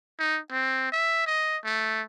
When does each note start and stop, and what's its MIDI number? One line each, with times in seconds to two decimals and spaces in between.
0.19 0.39 63
0.52 0.90 60
0.92 1.25 76
1.27 1.57 75
1.64 2.02 57